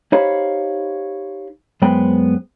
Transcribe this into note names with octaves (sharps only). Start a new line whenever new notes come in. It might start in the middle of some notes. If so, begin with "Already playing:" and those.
D#4 G4 C5 C#5 F5 B5
F#2 G#3 B3 C5 G5 B5